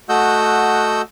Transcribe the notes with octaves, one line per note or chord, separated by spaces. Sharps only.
A3 F#4 D#5 F#5 E6 G6